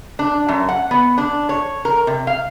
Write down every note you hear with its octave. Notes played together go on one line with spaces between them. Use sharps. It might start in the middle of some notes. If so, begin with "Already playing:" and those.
D4
F#2
F#5
B3
D4
C#5
A#4
C3
F5